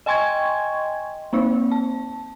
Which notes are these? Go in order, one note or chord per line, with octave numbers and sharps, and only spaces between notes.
D#5 G5 G#5 C6 C#6 G#6
A#3 C4 D#4 C5
A5